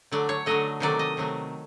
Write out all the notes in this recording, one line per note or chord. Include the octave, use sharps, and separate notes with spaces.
D3 F#3 A3 D5
C#5
D3 F#3 A3 D#5
C3 D#3 F#3 A3 D5
D#5
C3 D#3 F#3 A3